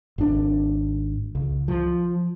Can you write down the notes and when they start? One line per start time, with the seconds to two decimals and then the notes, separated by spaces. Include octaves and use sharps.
0.18 G#1 D4
1.35 C#2
1.68 F3